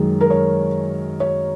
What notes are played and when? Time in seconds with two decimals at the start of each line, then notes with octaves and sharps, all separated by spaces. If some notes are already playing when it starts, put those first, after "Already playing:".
Already playing: F#2 D#3 G#3
0.21 A#4
0.30 C#5
1.20 C#5